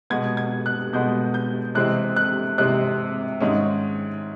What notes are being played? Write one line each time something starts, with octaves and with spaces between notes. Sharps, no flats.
B2 G#3 B3 G#6
G#6
F#6
B2 G#3 B3 G6
G6
C3 E3 G#3 C4 F#6
F#6
C3 E3 G#3 C4 F#6
G#2 D#3 G#3 C#4